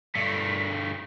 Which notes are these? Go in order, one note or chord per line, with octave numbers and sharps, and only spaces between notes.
G2 A3